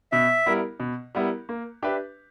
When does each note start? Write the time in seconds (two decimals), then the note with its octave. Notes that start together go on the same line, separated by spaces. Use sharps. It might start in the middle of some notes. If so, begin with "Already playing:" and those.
0.12 B2 E5
0.46 G3 B3 E4 A#4
0.80 B2
1.15 G3 B3 E4 A#4
1.49 A#3
1.82 D4 G4 B4 E5